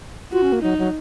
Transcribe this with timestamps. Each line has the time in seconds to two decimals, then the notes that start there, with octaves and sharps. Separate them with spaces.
0.32 F4 F#4
0.42 C#4
0.52 A#3
0.62 F#3 D#4
0.78 F#3